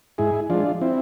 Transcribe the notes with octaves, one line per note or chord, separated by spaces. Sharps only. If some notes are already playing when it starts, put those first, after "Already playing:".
G#2 E4 G#4
F3 G#3 D4 F4
C4 E4